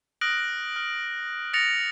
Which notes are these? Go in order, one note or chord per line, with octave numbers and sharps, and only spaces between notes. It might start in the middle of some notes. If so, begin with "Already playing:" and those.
D#6 F6 F#6 A#6 D7 F#7
F6
D#6 A6 A#6 C#7 F7